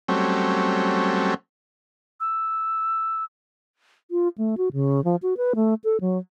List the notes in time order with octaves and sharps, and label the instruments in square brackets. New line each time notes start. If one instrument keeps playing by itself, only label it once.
[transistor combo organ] F#3 G3 A3 C4 C#4
[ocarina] E6
[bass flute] F4
A3
F#4
C#3
F3
F#4
B4
A3
A4
F#3